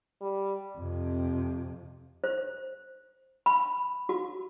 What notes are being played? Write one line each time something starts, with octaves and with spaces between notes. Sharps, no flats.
G3
F2 C3
C5
B5
F#4